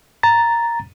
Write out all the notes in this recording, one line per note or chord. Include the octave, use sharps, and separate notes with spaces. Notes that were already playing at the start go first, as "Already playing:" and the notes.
A#5 A6